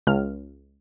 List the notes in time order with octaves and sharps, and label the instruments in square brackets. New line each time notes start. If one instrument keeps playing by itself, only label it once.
[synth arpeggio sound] C#2 F6